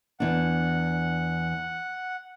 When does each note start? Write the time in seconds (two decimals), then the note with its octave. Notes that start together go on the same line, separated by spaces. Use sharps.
0.20 E2 D4 F#5